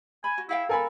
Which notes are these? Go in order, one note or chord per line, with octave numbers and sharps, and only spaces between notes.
G#5 B5
F#4
E4 G#4 F5 G5
A4 A#4 G#5 B5